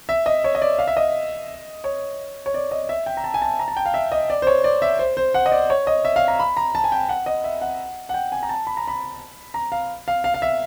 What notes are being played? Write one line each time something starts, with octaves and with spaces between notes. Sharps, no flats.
E5
D#5
C#5
D#5
D5
F5
E5
D#5
C#5
C#5
D5
D#5
E5
G5
A#5
A5
G#5
A5
A#5
A5
G5
F5
E5
D#5
D5
C5
C#5
D5
E5
C5
C5
F#5
D#5
D5
C#5
D#5
E5
F5
A#5
B5
A#5
A5
G#5
G5
F#5
D#5
E5
F#5
F#5
G5
G#5
A#5
A5
B5
A#5
B5
A#5
F5
F5
F5
F5
E5